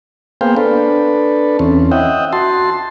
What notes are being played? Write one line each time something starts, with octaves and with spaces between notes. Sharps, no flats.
A#3 B3 G#4 C5 F5 G5
D4 A4 B4
E2 C4 C#4
D#5 E5 F#5 G5
F#4 A5 C6